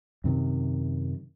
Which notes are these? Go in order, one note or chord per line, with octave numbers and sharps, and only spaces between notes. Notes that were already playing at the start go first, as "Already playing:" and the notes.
F#2 C3 D#3